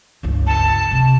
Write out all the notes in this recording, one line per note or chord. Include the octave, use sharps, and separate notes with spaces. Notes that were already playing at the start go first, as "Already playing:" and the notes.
G1 C#2
A5
C3 G#3